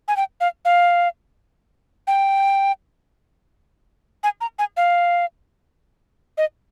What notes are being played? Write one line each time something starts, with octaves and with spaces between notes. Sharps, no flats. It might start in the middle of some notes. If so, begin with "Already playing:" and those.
G#5
G5
F5
F5
G5
G#5
A#5
G#5
F5
D#5